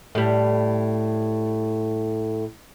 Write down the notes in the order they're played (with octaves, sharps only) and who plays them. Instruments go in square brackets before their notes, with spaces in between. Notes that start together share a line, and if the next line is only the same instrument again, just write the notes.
[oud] A2 G3